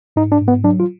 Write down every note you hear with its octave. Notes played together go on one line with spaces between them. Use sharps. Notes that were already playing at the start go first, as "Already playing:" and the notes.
G#2 D#4
D4
G#2
B3
F#3 D4
F4